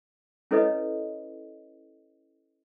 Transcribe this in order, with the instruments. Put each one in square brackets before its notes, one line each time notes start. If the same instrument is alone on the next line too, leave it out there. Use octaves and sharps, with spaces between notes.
[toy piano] C#4 E4 A4 B4 C#5 D#5